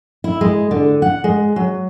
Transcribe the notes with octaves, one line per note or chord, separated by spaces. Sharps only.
E4
G#3
D3
F#5
G#3
F#3